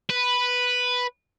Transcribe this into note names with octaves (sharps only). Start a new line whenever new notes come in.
B4